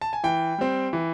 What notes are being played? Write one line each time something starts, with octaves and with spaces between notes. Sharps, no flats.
A5
G#5
E3 G5
G3 C4
E3